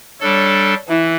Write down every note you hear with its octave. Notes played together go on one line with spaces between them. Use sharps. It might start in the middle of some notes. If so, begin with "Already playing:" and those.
G3 D4 A4 C#5
E3 E4